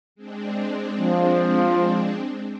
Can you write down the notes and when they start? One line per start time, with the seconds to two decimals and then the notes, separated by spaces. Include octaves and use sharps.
0.15 G#3 C4 D4
1.00 F3